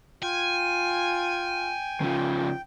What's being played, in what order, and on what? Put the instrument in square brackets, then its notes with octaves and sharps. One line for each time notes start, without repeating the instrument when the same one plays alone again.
[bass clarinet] F4 [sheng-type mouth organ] G5 [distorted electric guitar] G#5
[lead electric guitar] C#3 F3